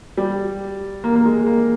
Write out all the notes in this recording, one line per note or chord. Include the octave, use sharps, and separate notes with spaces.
G3
A#3
A#3
G#3
A#3